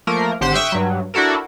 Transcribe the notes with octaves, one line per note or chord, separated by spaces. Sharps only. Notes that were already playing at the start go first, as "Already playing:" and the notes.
F3 A3 A#3 A#4
G#1 D3 G4 C5 F#5 C6
E5 G5 C#6 D#6 E6 F#6
G2 F#3
D4 E4 F#4 A4 A#4